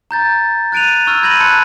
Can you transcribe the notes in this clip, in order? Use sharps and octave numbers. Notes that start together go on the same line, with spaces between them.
A#5 G6 A6
F#6 A6 D7 D#7 F7
C#6 E6 F6 G#6
B5 G6 G#6 A#6 D#7 F#7
A5 B5 C6 F#6 C#7 D#7